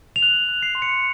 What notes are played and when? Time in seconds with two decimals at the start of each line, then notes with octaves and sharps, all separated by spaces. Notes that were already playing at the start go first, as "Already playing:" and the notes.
0.16 F7
0.22 F#6 F#7
0.49 F#6
0.63 C7
0.75 C6
0.82 C#7